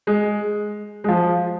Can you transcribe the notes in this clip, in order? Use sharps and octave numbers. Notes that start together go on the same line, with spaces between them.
G#3
G#3
F3